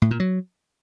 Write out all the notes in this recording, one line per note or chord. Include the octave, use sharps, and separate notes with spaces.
A2
A#2
F#3